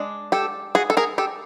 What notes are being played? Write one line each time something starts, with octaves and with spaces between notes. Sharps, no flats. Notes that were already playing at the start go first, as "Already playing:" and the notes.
Already playing: G#3 D4
G4 A4
F#4 G#4
A4
G#4 A#4
G4 A4